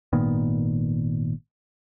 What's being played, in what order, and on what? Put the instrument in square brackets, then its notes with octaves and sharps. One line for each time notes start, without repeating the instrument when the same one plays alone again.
[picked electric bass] G#1 A#2 D#3 B3